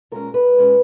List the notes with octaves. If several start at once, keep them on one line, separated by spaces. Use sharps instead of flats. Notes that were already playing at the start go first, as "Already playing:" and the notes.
A#2 G#3 C#4 A#4
B4
A#2 G#3 C#4